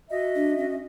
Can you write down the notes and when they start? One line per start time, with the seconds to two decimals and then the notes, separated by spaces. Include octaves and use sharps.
0.09 F#4 D#5 E5
0.35 D4
0.57 C#4